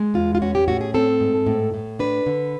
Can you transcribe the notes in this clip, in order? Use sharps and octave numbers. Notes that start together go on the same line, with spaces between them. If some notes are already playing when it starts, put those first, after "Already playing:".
Already playing: G#3
E2 F4
F4
C#4 F#4
G4
A2 F#4
G#4
C4 A4
G#2
A2
A2
D4 B4
D3